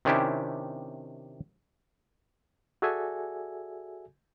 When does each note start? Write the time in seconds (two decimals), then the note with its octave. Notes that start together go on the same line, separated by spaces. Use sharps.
0.05 C3 D#3 C#4 D4 E4 G4
2.82 F#4 G#4 A4 D5 E5 G#5